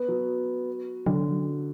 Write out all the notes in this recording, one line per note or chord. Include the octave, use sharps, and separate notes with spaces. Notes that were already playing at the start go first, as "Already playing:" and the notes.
Already playing: B3
F#3
D3 F#3